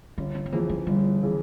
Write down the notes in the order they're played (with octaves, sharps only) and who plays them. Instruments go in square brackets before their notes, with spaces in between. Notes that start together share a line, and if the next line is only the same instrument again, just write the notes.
[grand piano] G1 [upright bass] C#4
[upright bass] C4
C4
[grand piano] F2 C#3 E3 [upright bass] A#3
[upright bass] G#3
[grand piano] G1 [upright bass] G3
[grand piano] C#3 E3